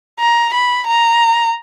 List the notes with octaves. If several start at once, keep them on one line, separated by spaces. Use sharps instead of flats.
A#5
B5
A#5